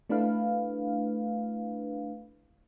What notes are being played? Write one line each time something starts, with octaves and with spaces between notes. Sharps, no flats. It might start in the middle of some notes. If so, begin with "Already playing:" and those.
A3 D4 E4 B4 F5